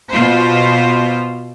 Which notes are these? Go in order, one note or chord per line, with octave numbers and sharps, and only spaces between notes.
B2 F4 C5